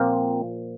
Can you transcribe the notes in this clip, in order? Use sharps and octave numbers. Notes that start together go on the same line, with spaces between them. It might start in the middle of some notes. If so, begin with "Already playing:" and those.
Already playing: A#2 F3 A#3 C4